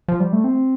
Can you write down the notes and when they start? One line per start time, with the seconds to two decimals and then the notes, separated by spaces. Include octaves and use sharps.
0.08 F3
0.20 G3
0.33 A3
0.44 C4